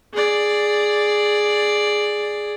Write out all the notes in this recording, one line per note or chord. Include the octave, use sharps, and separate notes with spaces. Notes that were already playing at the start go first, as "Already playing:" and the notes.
G#4 D5